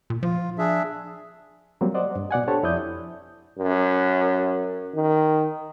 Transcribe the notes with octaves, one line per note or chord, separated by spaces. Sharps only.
A#2
F3 F4
D4 G#4 E5
F#3 G3 A#3 C4
C5 D5 D#5 F#5
G2
B2 D5 F#5 G#5
D4 G4 A4 C5 C#5 A5
F2 E4 D5 D#6 G6
F#2
D#3